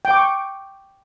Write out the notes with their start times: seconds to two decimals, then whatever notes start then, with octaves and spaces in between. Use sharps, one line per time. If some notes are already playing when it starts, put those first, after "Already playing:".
0.05 G5
0.11 D6
0.17 C#6